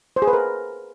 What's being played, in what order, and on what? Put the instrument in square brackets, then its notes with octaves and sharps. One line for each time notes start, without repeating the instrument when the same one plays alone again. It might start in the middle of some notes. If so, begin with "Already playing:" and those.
[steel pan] C5
G#4
B4
A#4